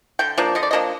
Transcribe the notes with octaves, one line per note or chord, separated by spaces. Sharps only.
D3 G5
F3 A#3 D4
D3 D#5
D5
F3 A#3 D4 D#5